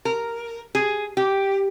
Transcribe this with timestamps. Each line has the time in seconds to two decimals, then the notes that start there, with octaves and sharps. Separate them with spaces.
0.05 A#4
0.75 G#4
1.17 G4